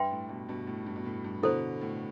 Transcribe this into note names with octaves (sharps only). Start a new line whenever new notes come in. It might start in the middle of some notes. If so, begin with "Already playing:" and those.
Already playing: G2 B4 E5 G5 C6
A2
G2 B2
G2 B2
A2
G2
B2
A2
G2
B2 D3 E4 A4 C5
A2